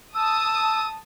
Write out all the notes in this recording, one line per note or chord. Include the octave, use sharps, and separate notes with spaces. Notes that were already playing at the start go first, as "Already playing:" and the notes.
A5 D#6 E6